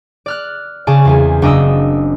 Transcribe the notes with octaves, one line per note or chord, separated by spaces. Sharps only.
D5 F6 F#6
C#3 G#4 D5 A5
E2 C4 G#4
F#1 D4 D5 D#5 D#6 E6